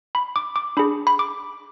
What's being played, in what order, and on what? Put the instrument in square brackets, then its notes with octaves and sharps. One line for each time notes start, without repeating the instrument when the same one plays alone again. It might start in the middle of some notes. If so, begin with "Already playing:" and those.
[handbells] B5
D6
D6
D4 G#4 B5
B5
D6